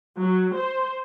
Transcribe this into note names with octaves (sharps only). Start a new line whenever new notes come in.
F#3
C5